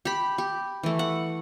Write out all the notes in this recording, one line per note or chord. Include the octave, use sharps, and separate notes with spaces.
G4 B5
G4
E3 A3
F#5